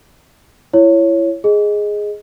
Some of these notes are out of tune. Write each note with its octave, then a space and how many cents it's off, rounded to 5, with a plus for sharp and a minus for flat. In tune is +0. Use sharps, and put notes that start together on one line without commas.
E4 +25 C#5 +0
G#4 +0 D#5 +0